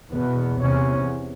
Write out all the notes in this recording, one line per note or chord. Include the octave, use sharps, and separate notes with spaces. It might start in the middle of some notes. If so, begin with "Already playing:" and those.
E2 B2 B3
E2 C3 C#4